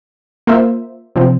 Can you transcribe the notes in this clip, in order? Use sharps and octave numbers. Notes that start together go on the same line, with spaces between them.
A#3 F4 C5 E5
C3 F3 C4